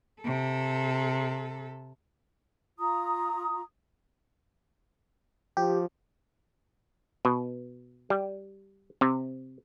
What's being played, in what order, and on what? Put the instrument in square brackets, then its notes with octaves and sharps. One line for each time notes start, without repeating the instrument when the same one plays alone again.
[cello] C3 A4
[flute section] F4 A#5 D#6
[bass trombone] F3 [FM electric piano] G4
[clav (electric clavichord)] B2
G3
C3